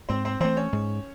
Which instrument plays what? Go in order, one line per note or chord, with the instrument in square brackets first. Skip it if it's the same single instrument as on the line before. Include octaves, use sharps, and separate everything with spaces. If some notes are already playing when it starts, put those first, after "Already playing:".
[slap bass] G#2 [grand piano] C4 C5
[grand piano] C4 C5
[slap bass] E3 A3 [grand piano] C4 C5
[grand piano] C#4 C#5
[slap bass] G#2